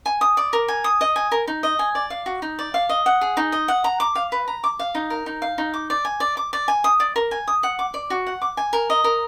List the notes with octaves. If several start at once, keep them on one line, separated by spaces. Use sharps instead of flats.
G#5
D#6
D5
A#4
G#5
D#6
D#5
G#5
A#4
D#4
D#5
G#5
D5
F5
F#4
D#4
D5
F5
D#5
F#5
G#4
D#4
D#5
F#5
A#5
D6
F5
B4
A#5
D6
F5
D#4
A#4
D#4
F5
D#4
D6
D5
G#5
D5
D6
D5
G#5
D#6
D5
A#4
G#5
D#6
F#5
D6
D5
F#4
F#5
D6
G#5
A#4
D#5
A#4